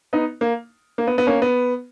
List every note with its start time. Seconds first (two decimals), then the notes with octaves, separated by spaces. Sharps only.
0.13 B3 D#4
0.41 A#3
0.98 A#3
1.07 B3
1.18 B3
1.27 A#3 C#4
1.42 B3